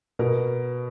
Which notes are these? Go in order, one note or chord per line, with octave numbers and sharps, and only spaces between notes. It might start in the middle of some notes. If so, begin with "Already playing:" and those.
B2 A#4